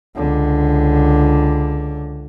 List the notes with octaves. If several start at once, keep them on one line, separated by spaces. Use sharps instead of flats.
C#2 D3